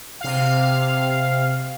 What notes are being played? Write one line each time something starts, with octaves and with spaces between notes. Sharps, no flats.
C3 F5